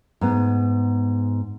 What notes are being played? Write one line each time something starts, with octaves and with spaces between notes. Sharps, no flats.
G#2 B3